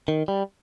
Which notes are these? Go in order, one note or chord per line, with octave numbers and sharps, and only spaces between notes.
D#3
G3